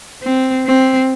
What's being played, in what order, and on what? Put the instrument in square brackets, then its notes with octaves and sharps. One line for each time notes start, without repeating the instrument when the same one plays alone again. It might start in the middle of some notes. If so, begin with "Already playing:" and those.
[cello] C4
C4